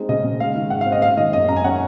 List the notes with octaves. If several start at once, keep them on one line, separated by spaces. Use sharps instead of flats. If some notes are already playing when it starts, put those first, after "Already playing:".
Already playing: G#3 C4 D#4
C#3 D#5
C#3
G#3 F5
D#3
G#2 F#5
F5
C4
D#5
G#3 F5
D#3 D#5
F#2 D#5
F#2 A#5
G#5
C#4 F#5